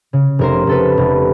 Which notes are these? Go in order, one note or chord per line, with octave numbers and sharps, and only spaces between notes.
C#3
F1 A#4 C5
F1 A4 B4
F1